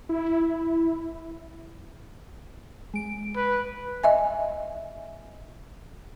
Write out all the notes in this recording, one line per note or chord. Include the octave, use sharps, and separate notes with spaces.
E4
G#3 D7
B4
D#5 E5 G#5